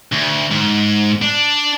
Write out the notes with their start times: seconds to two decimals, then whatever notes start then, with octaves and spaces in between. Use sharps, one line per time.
0.12 D2
0.51 G#2
1.22 D4